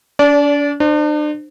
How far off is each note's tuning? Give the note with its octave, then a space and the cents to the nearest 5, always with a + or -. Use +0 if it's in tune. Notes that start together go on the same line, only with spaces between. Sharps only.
D4 -40 D5 -20
D4 +40 C5 +0